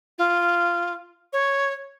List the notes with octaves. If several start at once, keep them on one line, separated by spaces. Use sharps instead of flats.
F4
C#5